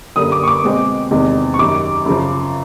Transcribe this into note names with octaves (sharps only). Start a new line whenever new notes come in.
F#2 D3 G3 A#3 D#6
D6
C#6
D6
B2 G#3 C4
E2 C3 D#3 G#3 C4
C#6
F#2 D#3 G3 D6
F#2 C#3 F3